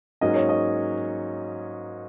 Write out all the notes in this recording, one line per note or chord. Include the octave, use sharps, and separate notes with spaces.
G#2 F#3 A#3 C#4 D#5
C#5
D#5